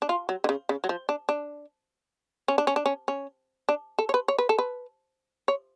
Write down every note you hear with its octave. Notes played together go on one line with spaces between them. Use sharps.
D4
F4
F#3
D3
C#3
C#3
F#3
F3
D4
D4
C#4
D4
C#4
D4
C#4
C#4
D4
A4
C#5
B4
C#5
B4
A4
B4
C#5